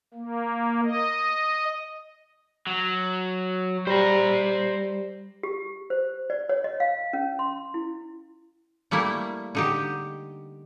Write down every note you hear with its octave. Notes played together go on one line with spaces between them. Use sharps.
A#3
D#5
F#3
G3 C5 A#5
G4
C5
D5
C#5
D#5
F5
C#4
C6
E4
G3 A3 A#3 E4
D3 D#4 G4